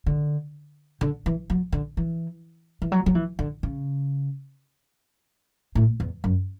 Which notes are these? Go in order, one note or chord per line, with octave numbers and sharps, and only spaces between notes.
D3
D3
E3
F#3
D3
E3
E3
F#3
F#3
E3
D3
C#3
A2
E2
F#2